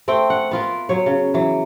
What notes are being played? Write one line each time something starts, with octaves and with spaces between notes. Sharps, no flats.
A3 C4 G5
F#5
B3 F4 A#4
F#3 C#5
C#3
E3 F#3